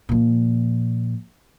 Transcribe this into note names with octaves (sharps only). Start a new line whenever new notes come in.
A#2 F3